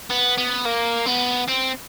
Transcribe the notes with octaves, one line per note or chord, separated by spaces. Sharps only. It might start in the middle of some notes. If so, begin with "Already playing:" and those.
B3
B3
A#3
B3
C4